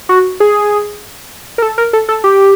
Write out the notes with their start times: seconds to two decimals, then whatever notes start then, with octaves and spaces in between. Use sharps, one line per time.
0.09 F#4
0.40 G#4
1.58 A#4
1.62 A4
1.78 A#4
1.93 A4
2.09 A4
2.24 G4